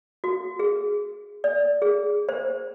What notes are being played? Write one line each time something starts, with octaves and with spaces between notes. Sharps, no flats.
F#4
G#4
D5
G#4
C5